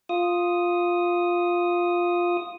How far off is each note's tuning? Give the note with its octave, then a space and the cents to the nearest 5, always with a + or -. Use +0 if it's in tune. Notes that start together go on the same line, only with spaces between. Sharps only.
F4 +5 D#6 +0